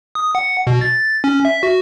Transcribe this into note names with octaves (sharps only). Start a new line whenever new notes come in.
D#6
F#5
B2
A6
C#4
E5
F#4